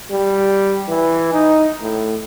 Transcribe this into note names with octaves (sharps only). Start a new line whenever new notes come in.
G3
E3
D#4
A2